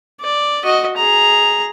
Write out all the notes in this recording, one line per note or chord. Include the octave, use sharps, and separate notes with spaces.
D5
F#4 D#5
G#4 A#5